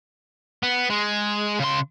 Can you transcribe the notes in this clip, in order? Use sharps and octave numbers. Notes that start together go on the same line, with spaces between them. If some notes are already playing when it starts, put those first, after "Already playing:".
B3
G#3
C#3 C6